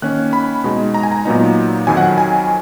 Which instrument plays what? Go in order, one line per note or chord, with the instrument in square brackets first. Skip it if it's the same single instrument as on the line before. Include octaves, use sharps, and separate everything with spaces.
[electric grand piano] D#3 A#3 C#4 F#6
B5
B2 G#3 D#4
A#5
G#5
A#5
A#2 F#3 B3 D#4
F2 D#3 F#3 G#5
F#5
G#5